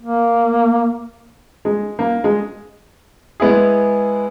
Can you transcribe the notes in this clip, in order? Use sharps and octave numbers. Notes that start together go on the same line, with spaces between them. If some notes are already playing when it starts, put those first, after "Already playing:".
A#3
G#3
A#3
G#3
G#3 B3 E4 G#4